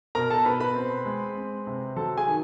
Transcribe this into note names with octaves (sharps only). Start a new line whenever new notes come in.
B2 A#4 A#5
A4 A5
B2 B4 B5
B4 B5
C4
G#3
C4
C3
F#3 A4 A5
G#4 G#5
D#3